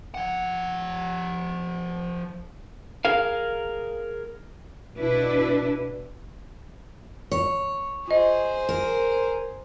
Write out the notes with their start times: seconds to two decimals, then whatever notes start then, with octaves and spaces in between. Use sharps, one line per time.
0.14 F3 F#5
3.05 G#4 A#4 F5
4.97 B2 D4 E4 B4
7.32 C#5
8.08 F4 G#4 C5 D#5
8.69 A#4